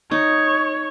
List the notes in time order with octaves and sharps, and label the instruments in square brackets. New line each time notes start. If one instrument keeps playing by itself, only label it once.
[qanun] D#4 [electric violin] C#5